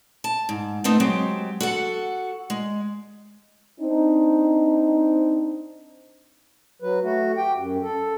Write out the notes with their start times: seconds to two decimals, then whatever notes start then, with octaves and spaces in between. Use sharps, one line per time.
0.24 A5
0.49 G#2
0.84 A3 B3 C4 D#4
1.00 F#3 G#3 C4 G4
1.60 F#4 A4 F#5
2.50 G#3
3.79 C4 D4 D#4
6.82 F#3 B4
7.03 A3 F#4
7.37 G4 G5
7.57 F#2
7.83 A4